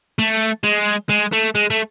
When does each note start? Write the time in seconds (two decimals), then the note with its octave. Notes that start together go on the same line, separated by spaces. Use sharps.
0.19 A3
0.64 G#3
1.09 G#3
1.32 A3
1.55 G#3
1.70 A3